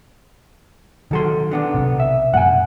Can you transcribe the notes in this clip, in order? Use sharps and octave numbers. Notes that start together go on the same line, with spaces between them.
B1 D#3 F#3 A4 C6
D3 B3 D4
B1 C3
E5
F#2 A#2 F#5 G#5